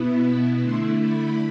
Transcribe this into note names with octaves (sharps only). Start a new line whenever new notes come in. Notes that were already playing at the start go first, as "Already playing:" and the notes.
Already playing: B2 B3 E4
B5
D3 A3 E4 C6
B5